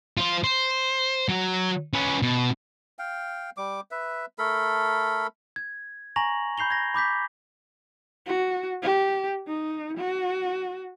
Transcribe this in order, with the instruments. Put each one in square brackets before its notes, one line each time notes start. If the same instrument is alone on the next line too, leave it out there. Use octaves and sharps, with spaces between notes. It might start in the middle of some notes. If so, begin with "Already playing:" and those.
[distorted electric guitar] F4 C5
C5
F#3
C#4 B4
B2
[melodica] F5 G5
G3 D6
B4 E5
A3 A4 A#4 B5
[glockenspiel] G#6
G#5 A#5 C#6 A#6 F7 F#7
B5 G6 C7 F7 G7
G#6 A#6
B5 D6 G6 B6
[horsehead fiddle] F#4
G4
D#4
F#4